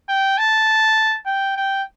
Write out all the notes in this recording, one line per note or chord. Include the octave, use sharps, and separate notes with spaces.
G5
A5
G5
G5